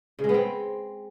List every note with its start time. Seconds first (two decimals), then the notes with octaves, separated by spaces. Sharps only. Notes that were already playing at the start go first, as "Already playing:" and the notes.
0.19 C#3
0.24 G#3
0.29 B3
0.34 C4